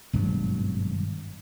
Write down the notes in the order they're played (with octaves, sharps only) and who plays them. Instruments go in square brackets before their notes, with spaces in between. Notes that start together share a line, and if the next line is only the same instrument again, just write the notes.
[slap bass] G#1 G2 B2 F#3